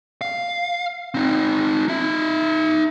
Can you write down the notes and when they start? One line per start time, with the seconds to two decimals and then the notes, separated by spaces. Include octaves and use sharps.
0.21 F5
1.14 C4 D#4
1.88 D#4 E5